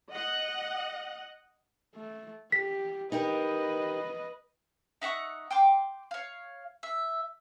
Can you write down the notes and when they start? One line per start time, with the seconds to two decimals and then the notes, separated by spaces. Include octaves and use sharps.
0.11 D#5 F#5
1.95 A3
2.52 G4 B6
3.12 D#4 G4 A#4 B4 D#5
5.02 D#4 E5 F#5 C#6
5.51 G5 C6 D6
6.11 C#5 F5
6.83 E5